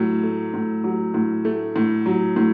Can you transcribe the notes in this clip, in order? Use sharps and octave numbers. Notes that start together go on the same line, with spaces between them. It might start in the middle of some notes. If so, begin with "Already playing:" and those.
Already playing: A2 F#3
A3
A2
F#3
A2
A3
A2
F#3
A2